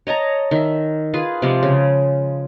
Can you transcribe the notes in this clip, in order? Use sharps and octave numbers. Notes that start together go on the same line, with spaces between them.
C#5 D#5 A5 A#5
D#3 E5
F4 G#4 B4
C3 F3 G#3 F4
C#3